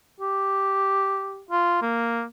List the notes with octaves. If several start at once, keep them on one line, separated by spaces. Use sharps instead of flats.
G4
F4
A#3